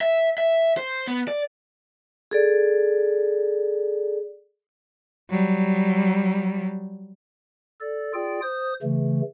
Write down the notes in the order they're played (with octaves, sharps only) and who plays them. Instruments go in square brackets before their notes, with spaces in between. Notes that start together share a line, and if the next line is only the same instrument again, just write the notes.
[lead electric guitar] E5
E5
C5
B3
D5
[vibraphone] G#4 A4 D5
[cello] F#3 G3
[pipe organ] A4 D5
F4 G#4 D5 G5
C5 D#6 G6
C#3 E3 A3